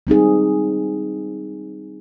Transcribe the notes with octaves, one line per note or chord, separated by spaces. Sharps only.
G3 C4 D#4 G#4